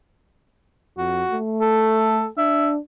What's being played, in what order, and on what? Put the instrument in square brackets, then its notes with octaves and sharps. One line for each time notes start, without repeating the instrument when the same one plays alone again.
[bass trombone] F2 [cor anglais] F#4
[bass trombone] A3
[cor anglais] A4
[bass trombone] D4 [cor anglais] E5